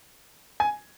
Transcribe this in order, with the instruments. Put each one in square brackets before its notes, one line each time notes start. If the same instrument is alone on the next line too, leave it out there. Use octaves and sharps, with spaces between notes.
[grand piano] G#5